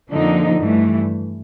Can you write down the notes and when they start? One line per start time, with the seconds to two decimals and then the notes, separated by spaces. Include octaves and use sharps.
0.12 F2 D3 F3 A#3 D#4
0.60 G2 E3 A3